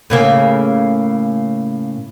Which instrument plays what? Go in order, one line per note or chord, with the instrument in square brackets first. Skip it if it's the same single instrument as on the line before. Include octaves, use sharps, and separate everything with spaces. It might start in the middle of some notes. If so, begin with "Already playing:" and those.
[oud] A2 C#3 A#3